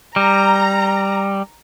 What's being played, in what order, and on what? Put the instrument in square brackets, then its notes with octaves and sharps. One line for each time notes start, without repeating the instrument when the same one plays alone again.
[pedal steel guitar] G3 [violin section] A#5